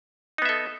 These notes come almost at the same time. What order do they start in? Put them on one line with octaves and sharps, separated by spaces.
D#4 B3 E5 A4